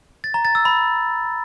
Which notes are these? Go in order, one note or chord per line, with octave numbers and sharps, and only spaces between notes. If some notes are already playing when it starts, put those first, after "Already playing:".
A6
A#5
A6
E6
B5